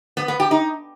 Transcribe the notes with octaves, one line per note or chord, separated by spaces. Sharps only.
B3
B3
G4
D#4